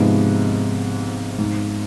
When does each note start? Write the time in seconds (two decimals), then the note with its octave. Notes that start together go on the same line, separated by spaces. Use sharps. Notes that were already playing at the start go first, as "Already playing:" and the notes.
Already playing: G#2 C3 F3 G#3 B3
1.39 G#2